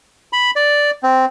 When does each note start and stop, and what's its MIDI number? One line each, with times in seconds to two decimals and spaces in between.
0.33 0.51 83
0.56 0.91 74
1.03 1.25 60